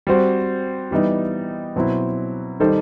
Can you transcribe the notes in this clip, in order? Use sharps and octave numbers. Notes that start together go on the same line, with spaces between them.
G3 C4 F#4 C5
E3 G3 B3 D#4
B2 F#3 C4 E4
D#3 G3 D#4 A4 C5